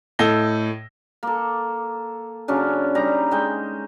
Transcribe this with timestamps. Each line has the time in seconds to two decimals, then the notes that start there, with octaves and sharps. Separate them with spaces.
0.19 A2 A4 D#5 E6 A#6 G7
1.23 A#3 A4
2.48 C#3 F#3 C#4 D4
2.95 G3 D#4 A#5
3.31 G#3 G5